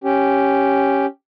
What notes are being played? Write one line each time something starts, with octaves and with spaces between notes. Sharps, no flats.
C#4 G4